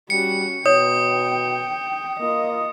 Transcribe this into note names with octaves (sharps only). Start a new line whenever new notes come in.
G3 C#4 F#4 C#7
B2 C#5 G5 D#6
A#3 F4 D#5